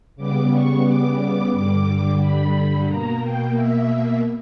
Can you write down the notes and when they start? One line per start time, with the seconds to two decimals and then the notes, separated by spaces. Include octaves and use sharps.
0.16 C#3 G3 B3 D6
0.51 C#6
0.84 D6
1.18 D6
1.52 G2 D3 G3 D6
2.20 B5
2.87 B2 A#3 A#5
3.21 G5
3.55 E5